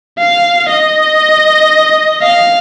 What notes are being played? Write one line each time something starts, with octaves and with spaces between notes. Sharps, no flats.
F5
D#5
F5